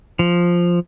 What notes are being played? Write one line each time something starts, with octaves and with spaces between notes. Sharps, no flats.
F3